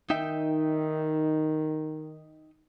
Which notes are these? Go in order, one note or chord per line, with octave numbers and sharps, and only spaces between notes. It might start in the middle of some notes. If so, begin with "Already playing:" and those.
D#3 D#4 E5 G5